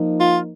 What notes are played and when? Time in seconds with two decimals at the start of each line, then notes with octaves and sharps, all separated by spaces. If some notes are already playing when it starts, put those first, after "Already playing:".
Already playing: F3 A#3 D#4
0.20 F4